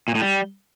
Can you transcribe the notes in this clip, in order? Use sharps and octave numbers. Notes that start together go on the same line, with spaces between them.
A#2
A2
G3